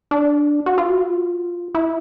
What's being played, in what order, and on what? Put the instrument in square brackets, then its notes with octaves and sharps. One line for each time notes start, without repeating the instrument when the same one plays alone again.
[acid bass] D4
F#4
F4
F#4
F4
E4